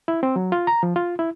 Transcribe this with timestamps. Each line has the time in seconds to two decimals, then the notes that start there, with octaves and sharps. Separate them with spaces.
0.08 E4
0.23 C4
0.36 F#3
0.52 F4
0.67 A#5
0.83 F3
0.96 F4
1.19 E4